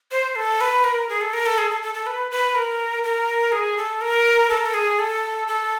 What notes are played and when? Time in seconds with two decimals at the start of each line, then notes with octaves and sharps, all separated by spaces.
0.11 C5
0.36 A4
0.61 B4
0.84 A#4
1.09 G#4
1.21 A4
1.33 A#4
1.46 A4
1.58 G#4
1.70 A4
1.82 A4
1.94 A4
2.06 B4
2.31 B4
2.55 A#4
3.04 A#4
3.52 G#4
3.77 A4
4.01 A#4
4.50 A4
4.57 A#4
4.66 A4
4.74 G#4
4.99 A4
5.48 A4